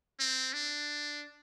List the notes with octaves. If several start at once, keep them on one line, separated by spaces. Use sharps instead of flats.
C4
D4